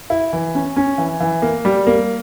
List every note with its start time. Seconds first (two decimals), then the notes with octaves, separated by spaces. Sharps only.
0.10 E4
0.33 E3
0.55 C#4
0.76 C#4
0.98 E3
1.20 E3
1.42 A#3
1.65 G3
1.87 A#3